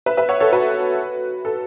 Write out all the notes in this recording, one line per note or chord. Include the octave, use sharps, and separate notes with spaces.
B4 E5
B4 E5
C#5 F#5
A4 C#5
F#4 B4
A4